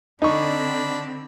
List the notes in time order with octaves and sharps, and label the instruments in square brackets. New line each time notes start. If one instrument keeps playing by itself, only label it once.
[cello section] D3 C4 [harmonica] D4 B5 [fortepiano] D#4 C#6